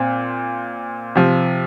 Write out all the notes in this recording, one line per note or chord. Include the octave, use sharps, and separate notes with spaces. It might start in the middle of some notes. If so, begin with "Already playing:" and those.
Already playing: A#2 C4
C3 F3